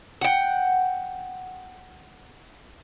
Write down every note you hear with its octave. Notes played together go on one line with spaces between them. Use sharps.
F#5 G5